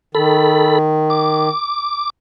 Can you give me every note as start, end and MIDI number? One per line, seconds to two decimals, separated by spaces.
0.15 1.48 51
0.15 0.79 69
0.15 0.79 83
1.10 2.10 86